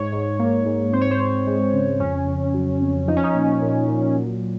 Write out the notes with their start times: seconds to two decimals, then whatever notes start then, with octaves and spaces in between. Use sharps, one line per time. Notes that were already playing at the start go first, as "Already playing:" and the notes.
Already playing: G#2 C#5
0.12 G#2
0.39 A#3
0.66 G#2
0.93 C4 C5
1.01 C#5
1.11 C5
1.20 C4
1.47 G#3
1.73 C#3
2.00 F2 C#4
2.27 F2
2.54 F#3
2.81 F2
3.08 F3 D#4
3.16 C#4
3.23 D#4
3.35 A#2
3.62 A#2
3.88 A#2
4.15 F#3